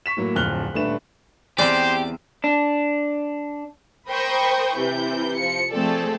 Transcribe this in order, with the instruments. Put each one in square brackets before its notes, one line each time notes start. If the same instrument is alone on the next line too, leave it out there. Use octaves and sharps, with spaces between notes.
[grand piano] C#6 B6 E7
A2 F#3 A#3
D1 F2 F6 F#6 G7
D#1 A3 D4 B4 E7
[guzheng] E2 C4 [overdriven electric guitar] G4 [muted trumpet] C5 [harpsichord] D5
[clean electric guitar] D4
[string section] A#4 C5 G5 B5 C#6 D#6
C3 E3 E4 G6
F3 C#7
F3 A3 C4 G#4 A4 D5